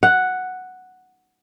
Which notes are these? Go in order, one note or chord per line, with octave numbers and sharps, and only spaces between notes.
F#5